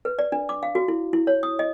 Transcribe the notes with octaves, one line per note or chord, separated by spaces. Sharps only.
B4
D5
D4
D6
F5
F#4
E4
E4
C#5
D#6
D#5